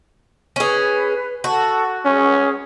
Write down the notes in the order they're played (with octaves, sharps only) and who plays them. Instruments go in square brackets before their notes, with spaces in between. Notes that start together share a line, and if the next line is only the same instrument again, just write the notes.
[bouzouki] C#4 G#4 [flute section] B4
[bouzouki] F#4 [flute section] A4 F#5 A5
[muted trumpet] C#4 [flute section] G#4